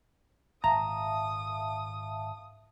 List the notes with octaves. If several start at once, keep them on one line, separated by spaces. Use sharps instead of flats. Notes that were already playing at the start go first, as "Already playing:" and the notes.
G#1 A#2 E5 F5 A5 A#5 D#6